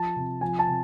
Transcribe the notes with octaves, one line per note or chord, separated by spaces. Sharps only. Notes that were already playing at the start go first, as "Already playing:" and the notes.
Already playing: F3 A5
C3
F3 G#5
A5
C3